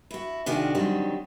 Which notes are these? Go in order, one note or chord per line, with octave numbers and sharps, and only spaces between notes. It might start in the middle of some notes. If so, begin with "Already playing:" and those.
E4 F#4
C3 D#3 D4 F4 F#4 G#4
D3 D#3 F#3 G3 C4